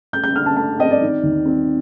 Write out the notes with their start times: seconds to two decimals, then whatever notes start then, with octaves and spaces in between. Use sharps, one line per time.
0.13 A3 G6
0.24 G6
0.35 D3 F6
0.46 A5
0.57 A3 A5
0.79 C4 D#5
0.90 D5
1.02 D#3
1.23 D#2
1.46 C4